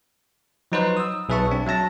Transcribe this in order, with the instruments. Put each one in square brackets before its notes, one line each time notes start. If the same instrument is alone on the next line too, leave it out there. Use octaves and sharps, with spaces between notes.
[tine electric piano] F3 F#3 D#4 F#4 B4 C5
D#6 E6
B1 G#4 B4 E5 A5 C#6
C4 D4
F#3 E5 A5 A#6